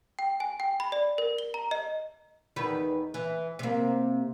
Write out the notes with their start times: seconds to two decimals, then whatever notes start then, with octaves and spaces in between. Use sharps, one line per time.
0.19 G5
0.40 G#5
0.60 G5
0.80 B5
0.92 D5
1.18 A#4
1.38 G7
1.54 A#5
1.71 D#5
2.56 E2 D#3 B4
3.14 E3
3.59 C3 A#3